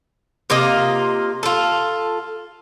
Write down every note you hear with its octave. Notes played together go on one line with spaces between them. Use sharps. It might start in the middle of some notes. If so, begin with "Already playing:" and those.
C3 A#3 F4 D#5
F4 A4